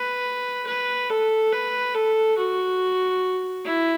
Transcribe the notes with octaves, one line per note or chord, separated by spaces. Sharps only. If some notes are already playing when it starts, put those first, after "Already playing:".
Already playing: B4
B4
A4
B4
A4
F#4
E4